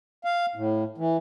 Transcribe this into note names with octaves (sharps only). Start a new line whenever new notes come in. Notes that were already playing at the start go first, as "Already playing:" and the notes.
F5
A2
E3